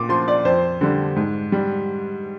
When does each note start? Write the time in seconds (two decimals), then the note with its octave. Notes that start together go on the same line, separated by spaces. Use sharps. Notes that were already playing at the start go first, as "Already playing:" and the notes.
Already playing: A#2 D6
0.09 F3 C6
0.28 D5
0.45 F2 C5
0.81 D3 G3
1.16 G#2
1.52 G3